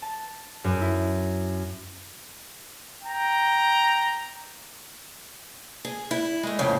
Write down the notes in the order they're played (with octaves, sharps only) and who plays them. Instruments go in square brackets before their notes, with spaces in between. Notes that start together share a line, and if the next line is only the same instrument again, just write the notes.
[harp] A5
F#2
E4
[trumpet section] G5 A#5
[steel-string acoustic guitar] G#4
E4
G#3 A3
F2 A2 C#3 A#3 F5